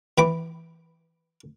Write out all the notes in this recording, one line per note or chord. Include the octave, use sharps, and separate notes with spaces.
E3 G5 B5 D6